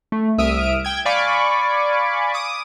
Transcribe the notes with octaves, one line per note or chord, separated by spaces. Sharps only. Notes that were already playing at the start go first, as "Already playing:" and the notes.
A3
C2 E5 D#6 F6 D7
G5 G#6
D5 F5 G#5 B5 C#6 D6
D6 D#6